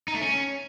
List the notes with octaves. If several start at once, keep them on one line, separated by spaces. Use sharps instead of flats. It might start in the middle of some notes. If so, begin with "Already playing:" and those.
D#4
A3
C#4